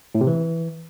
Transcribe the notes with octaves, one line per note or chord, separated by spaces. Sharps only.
A2
C3
E3